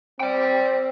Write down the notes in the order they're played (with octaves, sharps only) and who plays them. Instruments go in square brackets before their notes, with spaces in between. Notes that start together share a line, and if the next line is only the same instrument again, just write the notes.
[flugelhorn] C4 [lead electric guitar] D5 G5